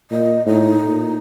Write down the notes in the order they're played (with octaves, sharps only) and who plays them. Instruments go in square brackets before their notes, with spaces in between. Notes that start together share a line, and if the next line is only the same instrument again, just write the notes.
[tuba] A#2 [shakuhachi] D#5
[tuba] A2 [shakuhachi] D#4
[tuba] A#2